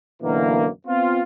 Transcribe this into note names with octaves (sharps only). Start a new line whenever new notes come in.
F#2 B2 D3 E3 A#3
B3 C4 F4